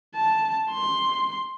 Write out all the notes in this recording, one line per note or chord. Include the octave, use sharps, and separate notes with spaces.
A5
C6